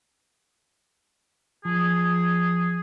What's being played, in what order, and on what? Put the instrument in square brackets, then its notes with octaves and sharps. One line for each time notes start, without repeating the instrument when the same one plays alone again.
[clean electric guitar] F3 [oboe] G#4